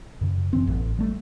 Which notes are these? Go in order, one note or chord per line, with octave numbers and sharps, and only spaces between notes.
F#2 C#3
G1 F#2 E3 C4
A1
G3 A3